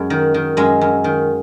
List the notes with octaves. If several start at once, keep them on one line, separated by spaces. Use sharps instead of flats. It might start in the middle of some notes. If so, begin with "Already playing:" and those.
Already playing: F#2 G#3
D#3
D#3
F#2 G#3
F#2
D#3